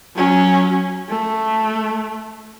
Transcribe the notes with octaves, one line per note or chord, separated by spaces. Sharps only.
F#3 C#4
A3